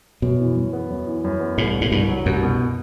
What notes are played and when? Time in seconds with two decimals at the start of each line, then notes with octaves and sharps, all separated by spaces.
0.22 F#2 B2
0.39 E3
0.56 F#2
0.73 B3
0.90 F#2
1.07 E3
1.24 F#2
1.41 B3
1.58 C2 A2
1.75 B2
1.81 A2
1.91 C2 G2
2.08 F#3
2.26 C2 F#2
2.43 B2